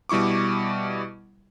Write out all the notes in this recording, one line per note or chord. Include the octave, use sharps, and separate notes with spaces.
B2 G3 E4 C#6 D6